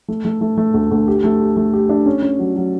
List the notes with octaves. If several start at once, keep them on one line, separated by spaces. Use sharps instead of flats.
A3
A3
A3
A3
D2
D2
G4
A3
G4
A3
G4
D4
C#4
C#4
F#3
F#3